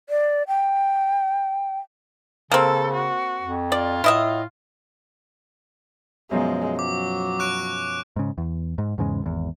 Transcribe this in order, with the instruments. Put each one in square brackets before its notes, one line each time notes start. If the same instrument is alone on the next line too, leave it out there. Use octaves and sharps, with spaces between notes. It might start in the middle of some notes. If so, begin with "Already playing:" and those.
[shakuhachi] D5
G5
[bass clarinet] C#3 [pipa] A#3 C4 [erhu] A4
[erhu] F#4
[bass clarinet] F2
[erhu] F4 [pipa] D5
[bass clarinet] A2 [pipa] E4 D#5 E5
[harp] F#2 B2 F3 [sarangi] G#3
[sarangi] F#3 [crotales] D6
[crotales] C#6 F#6 D7
[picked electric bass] G#2 C#3
E2
G#2
E2 G#2 C#3 G#3
G#1 E2